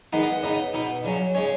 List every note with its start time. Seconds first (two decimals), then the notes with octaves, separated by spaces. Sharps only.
0.13 D#3 G#3 B3 D#4 F#5
0.23 D#5
0.33 F#5
0.43 C#3 B3 D#4 D#5
0.74 B2 B3 D#4
1.04 C#3 F#3 C#4
1.35 C#3 G#3 C#4 C#5